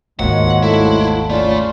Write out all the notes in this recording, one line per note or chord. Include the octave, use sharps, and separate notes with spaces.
G#1 D#2 D#3 F3 F#3 G#3 F#5
A3 E4
C#3 A3 F4 D5